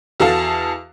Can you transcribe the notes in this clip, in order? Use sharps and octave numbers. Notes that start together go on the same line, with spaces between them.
E2 F#4 A4 F5 A5